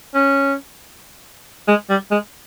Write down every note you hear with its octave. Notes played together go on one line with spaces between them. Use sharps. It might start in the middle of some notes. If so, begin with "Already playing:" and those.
C#4
G#3
G3
G#3